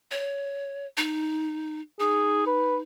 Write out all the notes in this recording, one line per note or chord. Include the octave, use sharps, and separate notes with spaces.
C#5
D#4
D#4 G#4
B4